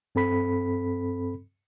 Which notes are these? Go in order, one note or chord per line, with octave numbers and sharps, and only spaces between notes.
G2 C4 A4 B5 B6